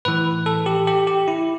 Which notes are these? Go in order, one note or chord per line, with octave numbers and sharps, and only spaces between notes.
A2 E3 B4
A4
G4
G4
G4
E4